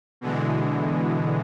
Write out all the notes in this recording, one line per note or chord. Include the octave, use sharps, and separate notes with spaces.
B2 D3 E3 G#3